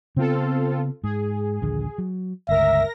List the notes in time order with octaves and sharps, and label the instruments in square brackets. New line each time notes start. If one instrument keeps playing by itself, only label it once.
[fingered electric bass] C#3 B3 [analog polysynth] C4 F4 A4
[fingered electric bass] G#2 [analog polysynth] G#4
[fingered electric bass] A#1 D#2 D3
F#3
[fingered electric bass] G1 C#2 [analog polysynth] A#4 A#6 [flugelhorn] E5